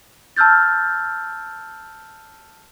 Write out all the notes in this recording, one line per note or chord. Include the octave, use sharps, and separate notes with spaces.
A5 E6 F6 G6 A6